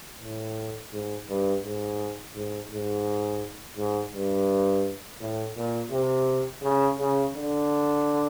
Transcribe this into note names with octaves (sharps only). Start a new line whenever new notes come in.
A2
G#2
G2
G#2
G#2
G#2
G#2
G2
A2
A#2
C3
C#3
C#3
D3